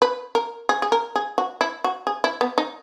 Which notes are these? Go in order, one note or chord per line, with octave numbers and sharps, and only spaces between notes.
B4
A#4
G#4
G#4
A#4
G#4
F#4
E4
F#4
G#4
E4
B3
D#4